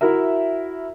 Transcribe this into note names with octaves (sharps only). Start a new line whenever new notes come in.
E4 F#4 A#4 E5